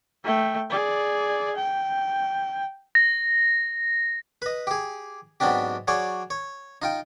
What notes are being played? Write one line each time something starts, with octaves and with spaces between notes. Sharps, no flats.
A3 G5
G#4 D5
G5
A#6
B4 D#5
G4 G#4
G#2 F#3 B3 C4 D4 G4
F#3 G#4 C#5 D5
C#5
D#4 F4 G5